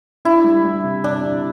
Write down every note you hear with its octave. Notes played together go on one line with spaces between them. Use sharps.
D4 E4
G3
G3
C3
C3 D4
C3